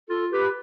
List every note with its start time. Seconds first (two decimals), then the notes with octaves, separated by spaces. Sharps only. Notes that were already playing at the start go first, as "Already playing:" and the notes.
0.09 F4 A4
0.32 G4 B4